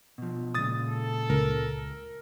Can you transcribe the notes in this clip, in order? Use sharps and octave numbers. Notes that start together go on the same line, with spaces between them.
B2 F3
A#2 C#3 G#3 D#6 A6
A4
C#2 A#4